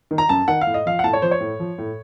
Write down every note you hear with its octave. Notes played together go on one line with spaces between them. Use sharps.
D#3
A#5
F#2 A5
D#3 F#5
F5
A2
D#5
F3 F5
F#5
A2 A5
C#5
F3 C5
C#5
A2
F3
A2